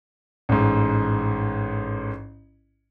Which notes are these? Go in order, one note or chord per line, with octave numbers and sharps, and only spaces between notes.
A1 G#2